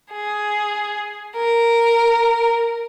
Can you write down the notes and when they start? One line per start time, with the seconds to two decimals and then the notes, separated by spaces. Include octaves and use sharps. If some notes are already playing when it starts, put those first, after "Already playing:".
0.13 G#4
1.36 A#4